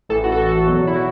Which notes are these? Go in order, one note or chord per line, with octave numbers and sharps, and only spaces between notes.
A1 A2 E3 A4
F#4
A4
F#4
E2 B2 F#3
E4
F#4